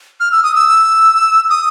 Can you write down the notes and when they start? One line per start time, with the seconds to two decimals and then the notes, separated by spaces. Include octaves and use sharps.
0.20 F6
0.32 E6
0.43 D#6
0.55 E6
1.50 D#6